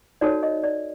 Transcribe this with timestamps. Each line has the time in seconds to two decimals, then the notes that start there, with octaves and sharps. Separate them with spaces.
0.21 D#4 F#4 A4 C#5 D5
0.43 D#5
0.64 D5